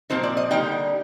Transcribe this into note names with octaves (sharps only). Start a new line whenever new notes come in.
A#2 F3 C4 D#4 C5
D5
D#5
D3 G3 A#3 D#4 G5